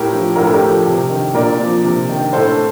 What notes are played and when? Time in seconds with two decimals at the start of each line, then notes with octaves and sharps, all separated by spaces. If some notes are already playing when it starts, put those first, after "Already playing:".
Already playing: A2 G4 A#4
0.12 F3
0.36 A2 A#4
0.45 A4
0.53 G4 A#4
0.62 F3
0.85 C3
1.10 D#3
1.34 A#2 A#4 D5
1.60 F3
1.84 C3
2.09 D#3
2.33 A2 A4 C5